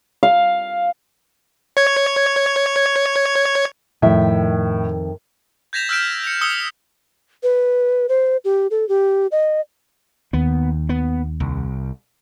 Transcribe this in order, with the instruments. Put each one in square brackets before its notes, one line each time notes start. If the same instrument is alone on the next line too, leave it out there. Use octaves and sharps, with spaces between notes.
[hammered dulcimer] F5
[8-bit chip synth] C#5 G#6
[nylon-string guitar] F2 D#3 E5 [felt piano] A2
[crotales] G6 G#6 A#6 B6 E7 F7
E6 F6 G6 B6 D7 E7
C#7 F7
D#6 E6 C#7 G7
[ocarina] B4
C5
G4
A4
G4
D#5
[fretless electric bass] D#2 [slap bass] B3
[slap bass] B3
C2